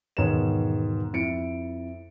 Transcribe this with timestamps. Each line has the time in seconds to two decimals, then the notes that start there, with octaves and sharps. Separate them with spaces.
0.17 E1 G#2 D#3 B3 C#5 E7
1.13 F2 E4 C#7 D7